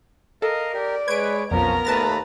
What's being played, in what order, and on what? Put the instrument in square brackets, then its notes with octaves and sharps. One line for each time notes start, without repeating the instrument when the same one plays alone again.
[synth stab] A4 [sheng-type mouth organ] A#4 D#5 F5
[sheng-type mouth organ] G4 A#4 [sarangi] D5
[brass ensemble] G#3 B4 [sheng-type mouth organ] C#5 [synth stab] G#6 D7
[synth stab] B1 F2 [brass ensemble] F3 C#4 [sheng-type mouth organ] B3 A#4 [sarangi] A#5
[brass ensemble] D#2 A3 B4 [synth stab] A5 A6 A#6